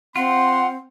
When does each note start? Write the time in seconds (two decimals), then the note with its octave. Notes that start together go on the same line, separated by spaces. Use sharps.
0.16 C4 F4 F#5 C6